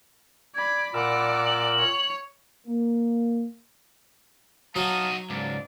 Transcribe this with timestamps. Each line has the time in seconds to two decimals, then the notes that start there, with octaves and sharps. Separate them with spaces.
0.55 D5 B5 G#6
0.94 A#2 A#4 D5 F#5 B5 E6
1.45 F#7
1.79 C#5
2.67 A#3
4.76 F#3 D#4 F#4 F5 A5 D#6
5.30 C#2 G#2 A#3 D4 D5